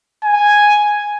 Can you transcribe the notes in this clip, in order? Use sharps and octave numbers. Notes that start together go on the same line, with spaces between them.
G#5